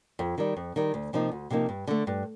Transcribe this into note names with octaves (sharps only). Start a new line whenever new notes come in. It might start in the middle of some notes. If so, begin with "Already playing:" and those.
F2
D#3 G3
F2
D#3 G3
D2
C3 F3 A#3 D#4
D2
C3 F3 A#3 D#4
G2
D3 A3
G2